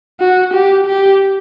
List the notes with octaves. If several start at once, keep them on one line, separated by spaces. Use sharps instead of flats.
F#4
G4
G4